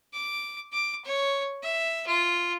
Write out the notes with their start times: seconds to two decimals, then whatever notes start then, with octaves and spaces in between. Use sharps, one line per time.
0.13 D6
0.73 D6
1.05 C#5
1.63 E5
2.07 F4